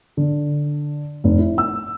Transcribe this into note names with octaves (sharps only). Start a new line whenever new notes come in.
D3
F1
E4
E6